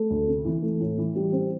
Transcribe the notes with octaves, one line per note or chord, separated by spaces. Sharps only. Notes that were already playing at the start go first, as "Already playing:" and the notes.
Already playing: A3
D2
C3
E3
A3
A2
E3
G3
C4